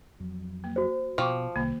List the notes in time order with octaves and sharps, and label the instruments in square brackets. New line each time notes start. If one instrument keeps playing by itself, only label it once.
[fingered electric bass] F2 F#3
[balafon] A#3
[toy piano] F#4 C5
[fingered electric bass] B2 [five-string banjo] F3 [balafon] G5 C#6 D6
[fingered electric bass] C2 [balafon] D#3 A#3